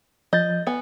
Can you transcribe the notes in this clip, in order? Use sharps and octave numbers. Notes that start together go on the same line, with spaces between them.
F3 D#5 G6 A6
B3 G#5